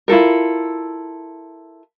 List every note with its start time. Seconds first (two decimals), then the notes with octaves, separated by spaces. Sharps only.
0.08 E4 F4 A4 A#4